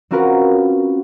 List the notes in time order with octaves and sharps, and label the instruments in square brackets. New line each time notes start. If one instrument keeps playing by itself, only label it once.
[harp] C4 C#4 F4 F#4 A#4 B4